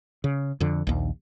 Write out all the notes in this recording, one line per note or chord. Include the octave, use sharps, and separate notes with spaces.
C#3
F2 D3
A#1 D#2